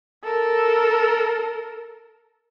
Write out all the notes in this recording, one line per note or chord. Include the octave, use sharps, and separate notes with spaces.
A4 A#4